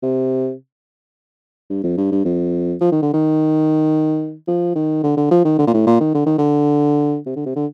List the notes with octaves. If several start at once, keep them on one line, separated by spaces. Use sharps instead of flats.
C3
G2
F2
G2
G2
F2
F3
D#3
D3
D#3
F3
D#3
D3
D3
F3
D#3
D3
A#2
A2
A#2
D#3
D3
D#3
D3
C3
D3
C3
D3